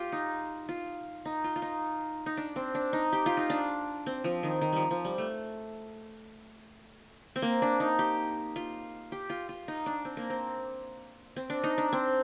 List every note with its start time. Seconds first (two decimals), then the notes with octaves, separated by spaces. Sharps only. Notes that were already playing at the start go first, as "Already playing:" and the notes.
Already playing: F4 G4
0.12 D#4
0.69 F4
1.25 D#4
1.44 F4
1.56 F4
1.62 D#4
2.26 D#4
2.37 D4
2.56 C4
2.75 D4
2.93 D#4
3.13 G4
3.26 F4
3.37 D#4
3.50 D4
4.06 C4
4.24 F3
4.43 D#3
4.61 D#3
4.73 F3 G3
4.91 F3
5.05 G3
5.18 A3
7.36 C4
7.42 A#3
7.62 D4
7.80 D#4
7.99 G4
8.56 F4
9.12 G4
9.30 F4
9.49 F4
9.68 D#4
9.86 D4
10.05 C4
10.17 A#3
10.30 C4
11.36 C4
11.50 D4
11.64 D#4
11.78 D4
11.93 C4